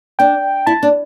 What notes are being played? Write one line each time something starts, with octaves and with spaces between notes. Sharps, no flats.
D4 G5
E4 A5
D4